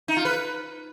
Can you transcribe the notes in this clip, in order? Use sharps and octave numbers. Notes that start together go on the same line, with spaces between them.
D#4
F4
B4